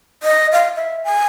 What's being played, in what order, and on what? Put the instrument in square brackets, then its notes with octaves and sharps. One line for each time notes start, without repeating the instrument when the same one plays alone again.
[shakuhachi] D#5
F5
E5
G#5